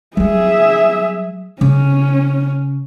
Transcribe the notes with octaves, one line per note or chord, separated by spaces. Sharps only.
F#3 G3 G#4 E5
C#3 C#4